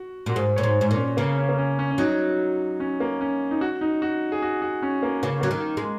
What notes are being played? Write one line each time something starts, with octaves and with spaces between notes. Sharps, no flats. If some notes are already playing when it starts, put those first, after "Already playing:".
Already playing: F#4
A#2 F#4
G#2 G#4
A#2 C#5
G#2
G#2
A#2
C#4
C#3 A#3
C#4
A#3
C#4
C#4
C#4
F#3 D#4
C#4
A#3
C#4
D#4
F#4
D#4
F#4
G#4
F#4
F#4
C#4
A#3
C#3 A#3
F#3 A#3
D#3
G#3